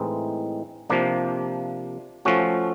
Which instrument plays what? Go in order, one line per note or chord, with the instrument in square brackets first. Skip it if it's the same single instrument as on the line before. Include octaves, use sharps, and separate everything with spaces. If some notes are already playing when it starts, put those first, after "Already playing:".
Already playing: [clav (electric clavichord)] A2 E3 G#3 C4 D#4
C3 F3 A#3 D4
F3 A3 C#4 F#4